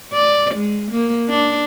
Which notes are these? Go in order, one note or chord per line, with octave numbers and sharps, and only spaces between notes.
D5
G#3
A#3
D4